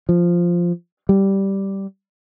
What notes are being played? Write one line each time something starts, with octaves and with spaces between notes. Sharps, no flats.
F3
G3